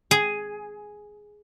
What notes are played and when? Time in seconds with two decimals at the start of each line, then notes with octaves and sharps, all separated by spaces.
0.11 G#4